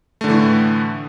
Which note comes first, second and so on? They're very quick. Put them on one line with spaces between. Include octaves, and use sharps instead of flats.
A3 D3 E3 A2